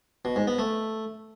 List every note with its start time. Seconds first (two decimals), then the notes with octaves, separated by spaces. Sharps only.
0.25 B2
0.36 G#2
0.47 B3
0.59 A3